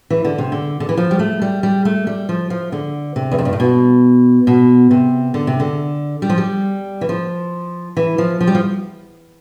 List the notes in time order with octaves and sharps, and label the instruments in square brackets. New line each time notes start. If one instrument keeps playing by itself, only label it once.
[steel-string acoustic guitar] E3
D3
C3
D3
D3
E3
F3
G3
A3
G3
G3
A3
G3
F3
F3
D3
C3
E2
F2
G2
A2
B2
B2
C3
D3
C3
D3
G3
F3
G3
E3
F3
E3
F3
F3
G3
F3